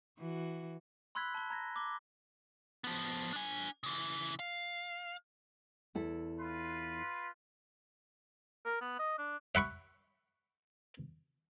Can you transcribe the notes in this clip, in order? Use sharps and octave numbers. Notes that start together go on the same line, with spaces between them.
E3 F#4
B5 C6 E6 F#6 G#6 B6
A5 G7
A#5 G#6 A#6
D6 G7
F3 B3
D4 G#5
C#3 E3
F5
E2 E4 A4
F4 B4 C6
A#4
B3
D#5
D4
E5 F#5 B5 C#6